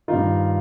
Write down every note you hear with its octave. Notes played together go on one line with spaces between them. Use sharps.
G2 D#3 D#4 F4